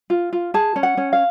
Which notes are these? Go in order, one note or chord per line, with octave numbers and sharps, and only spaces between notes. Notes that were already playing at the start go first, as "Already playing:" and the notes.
F4
F4
G#4 A5
C#4
F#5
C#4
F5